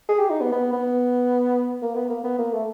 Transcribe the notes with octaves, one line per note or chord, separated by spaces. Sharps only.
G#4
G4
D#4
B3
B3
B3
A#3
B3
A#3
B3
A#3
A3